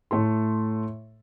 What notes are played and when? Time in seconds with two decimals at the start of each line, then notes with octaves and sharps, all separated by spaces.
0.11 A2 A3 A4 C6